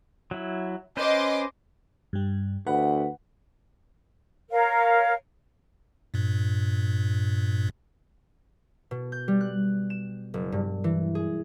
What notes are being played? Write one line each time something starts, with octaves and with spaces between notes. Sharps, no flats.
F#3 E4
C#4 B4 C5 D#5 C6 D6
G2 G3
D2 B4 F#5
A#4 C#5 F5
G2 A#2
B2
G6
G3
F#6
E7
F#1
G2
E3
G#4